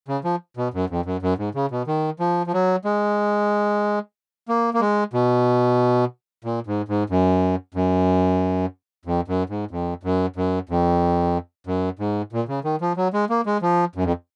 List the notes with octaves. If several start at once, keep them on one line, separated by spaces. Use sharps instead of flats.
C#3
F3
B2
F#2
F2
F#2
F#2
G#2
C#3
B2
D#3
F3
F3
F#3
G#3
A#3
A#3
G#3
B2
A#2
G#2
G#2
F#2
F#2
F2
F#2
G#2
F2
F#2
F#2
F2
F#2
G#2
A#2
C#3
D#3
F3
F#3
G#3
A#3
G#3
F3
F#2
F2